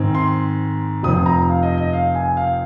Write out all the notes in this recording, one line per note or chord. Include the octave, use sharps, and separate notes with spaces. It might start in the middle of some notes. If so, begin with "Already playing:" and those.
Already playing: G#2 D#3 C4
C6
F1 F2 F3 D#6
A#5
F5
D#5
D#5
F5
G#5
F5